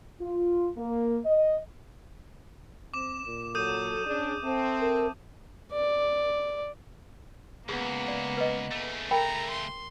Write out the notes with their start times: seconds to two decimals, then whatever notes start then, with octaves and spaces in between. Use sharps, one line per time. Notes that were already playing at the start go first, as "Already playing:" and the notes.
0.21 F4
0.78 A#3
1.26 D#5
2.94 C4 D6 E7
3.25 A#2
3.55 F#3 A4 D#6 G6 D#7
4.06 C#4 D4 G#4
4.43 C4 A4 E5 A5
4.80 A#4
5.72 D5
7.69 C#2 A#3 B3 G#4
8.08 D5
8.37 B4 D#5
8.72 C#3 A3
9.11 A#4 G5 A#5 B5
9.51 C6